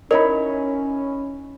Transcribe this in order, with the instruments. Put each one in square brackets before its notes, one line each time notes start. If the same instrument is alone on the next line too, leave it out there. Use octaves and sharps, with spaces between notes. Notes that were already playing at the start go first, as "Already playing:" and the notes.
[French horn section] C#4 [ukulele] D#4 E4 C#5 [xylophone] A#4 [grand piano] D#5 B5